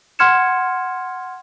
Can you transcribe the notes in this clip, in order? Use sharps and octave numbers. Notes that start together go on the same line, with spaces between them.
F#5 C6 F6 G#6 C#7 E7